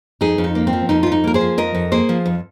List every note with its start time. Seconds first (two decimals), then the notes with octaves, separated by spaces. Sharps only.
0.21 F2 D#4 G#4
0.38 F2
0.44 D#4
0.55 A#3
0.67 C4
0.73 F3
0.89 F2 D#4
1.03 F2 F4
1.12 D#4
1.24 A#3 A#4
1.34 G#4 C5
1.41 F3
1.58 F2 A#4 D#5
1.75 F2
1.92 A#3 G#4 C5
2.09 F3
2.26 F2